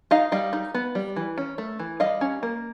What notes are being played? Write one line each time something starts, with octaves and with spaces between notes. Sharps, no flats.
D#4 D#5 F5
G3 D#5 F5
D#4
B3
G3
E3
C#4
A3
E3
G3 D#5 F5
C#4
A#3